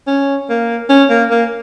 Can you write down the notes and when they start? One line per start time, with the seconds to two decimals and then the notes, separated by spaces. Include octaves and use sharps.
0.07 C#4
0.49 A#3
0.89 C#4
1.10 A#3
1.30 A#3